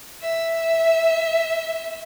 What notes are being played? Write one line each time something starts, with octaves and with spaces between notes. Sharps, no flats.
E5